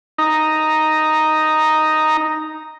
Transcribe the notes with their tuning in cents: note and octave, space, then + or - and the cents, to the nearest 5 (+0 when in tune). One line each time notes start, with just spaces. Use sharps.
D#4 +0 A#5 +0